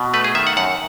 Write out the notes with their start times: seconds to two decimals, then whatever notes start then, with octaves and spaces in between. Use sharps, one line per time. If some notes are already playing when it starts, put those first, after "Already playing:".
Already playing: B2
0.14 A3 B4
0.24 G#4
0.35 D#3 E5
0.47 F#5
0.57 F#2 F#5